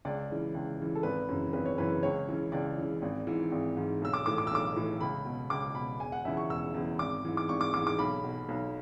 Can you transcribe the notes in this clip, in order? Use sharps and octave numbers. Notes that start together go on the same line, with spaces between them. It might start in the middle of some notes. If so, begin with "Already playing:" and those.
C#2 D5
C#3 E3
C#2
C#3 E3
A4
G#1 B4
F#2 C#3 E3
G#1 B4
C#5
F#2 C#3 E3 B4
C#2 C#5
C#3 E3
C#2 D5
C#3 E3
G#1
G#2 E3
G#1
G#2 E3
B1 E6
D6
A2 E3 D6
D6
E6
B1 D6
A2 E3
C#2 B5
B2
C#2 D6
B2 B5
E1 G#5
F#5
E2 C#3 E3 E5
C#6
E1 E6
E2 C#3 E3
G#1 D6
G#2 E3
D6
G#1 C#6
D6
G#2 E3 D6
D6
B1 B5
B2
B1